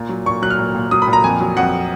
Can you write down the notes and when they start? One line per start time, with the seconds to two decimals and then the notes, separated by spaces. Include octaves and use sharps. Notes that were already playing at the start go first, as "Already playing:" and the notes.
Already playing: A#2
0.09 F#3
0.26 A#2 C#6
0.42 F#3 F#6
0.50 F6
0.59 A#2
0.75 A#2
0.91 F#3 D#6
1.02 B5
1.08 A#2
1.13 A#5
1.24 F2 G#5
1.40 F#3
1.57 F2 F#5